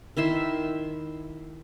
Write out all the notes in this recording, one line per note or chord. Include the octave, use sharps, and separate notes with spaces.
D#3 E4 E5 C6